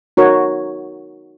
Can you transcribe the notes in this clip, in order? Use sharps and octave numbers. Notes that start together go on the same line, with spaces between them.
D#4 F#4 A#4 C#5